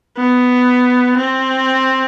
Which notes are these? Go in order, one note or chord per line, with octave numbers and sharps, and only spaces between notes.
B3
C4